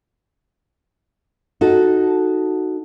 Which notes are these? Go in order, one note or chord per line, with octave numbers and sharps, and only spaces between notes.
D#4 F#4 A4